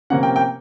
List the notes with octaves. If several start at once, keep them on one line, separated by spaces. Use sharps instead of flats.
C3 F3 A#3 C#4 F#5
G5
G5